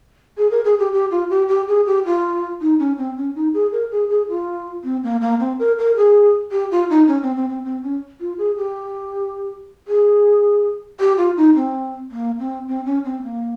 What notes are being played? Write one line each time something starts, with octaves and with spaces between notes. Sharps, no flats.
G#4
A#4
G#4
G4
G4
F4
G4
G4
G#4
G4
F4
D#4
C#4
C4
C#4
D#4
G#4
A#4
G#4
G#4
F4
C4
A#3
A#3
C4
A#4
A#4
G#4
G4
F4
D#4
C#4
C4
C4
C4
C4
C#4
F4
G#4
G4
G#4
G4
F4
D#4
C4
A#3
C4
C4
C#4
C4
A#3